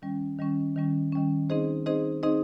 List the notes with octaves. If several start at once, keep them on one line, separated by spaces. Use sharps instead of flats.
D#3 G3 C#4
D#3 G3 C#4
D#3 G3 C#4
D#3 G3 C#4
C4 D#4 G#4 C5 D#5
C4 D#4 G#4 C5 D#5
C4 D#4 G#4 C5 D#5